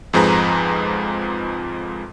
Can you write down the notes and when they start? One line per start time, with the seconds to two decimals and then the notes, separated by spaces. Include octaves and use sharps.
0.13 F2 G#2 F3 G#4 B4 A#5